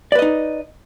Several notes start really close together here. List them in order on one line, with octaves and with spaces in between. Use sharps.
D5 B4 D#5 D#4